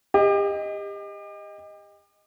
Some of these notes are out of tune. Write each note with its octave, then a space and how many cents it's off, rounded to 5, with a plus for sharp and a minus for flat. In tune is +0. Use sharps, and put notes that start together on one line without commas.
G4 +35 D#5 +0